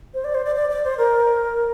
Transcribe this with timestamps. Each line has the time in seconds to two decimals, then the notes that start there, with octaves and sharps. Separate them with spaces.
0.14 C5
0.24 D5
0.35 C5
0.45 D5
0.56 D5
0.70 D5
0.84 C5
0.98 A#4